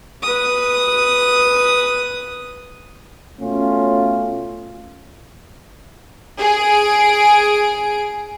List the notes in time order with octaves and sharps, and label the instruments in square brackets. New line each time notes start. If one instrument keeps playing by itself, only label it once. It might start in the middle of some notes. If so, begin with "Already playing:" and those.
[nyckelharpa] B4 D#6
[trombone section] B2 A3 C#4 [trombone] F4
[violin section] G#4 D7